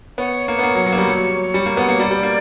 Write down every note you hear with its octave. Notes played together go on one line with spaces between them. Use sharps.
B3 C#5
A#3
B3
A#3
F#3
F#3
A#3
G3
F#3
G3
A#3
B3
A#3
G3 D5
G3
A#3